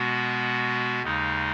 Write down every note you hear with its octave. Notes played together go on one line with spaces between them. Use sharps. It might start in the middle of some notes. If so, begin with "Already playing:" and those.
Already playing: B2 G#3 B3 F#4
D#2 C#3 G#3 D#4